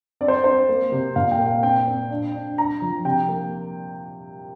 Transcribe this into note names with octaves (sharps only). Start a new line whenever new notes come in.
C4 D5
C5
C4 C5
A#3
C3
A#2 F5
G5
A#3
F5
C4 G5
C4
D4
D4
D4 A#5
F3
C3 G5
A#3